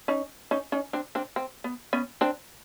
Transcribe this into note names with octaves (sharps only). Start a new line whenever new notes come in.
C#4 D#4
C#4 D#4
C#4 D#4
C4 D4
C4 D4
C4
B3
B3 C#4
C4 D4